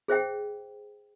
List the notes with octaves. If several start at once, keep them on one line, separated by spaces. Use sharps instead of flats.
G#4 C5 E5 G5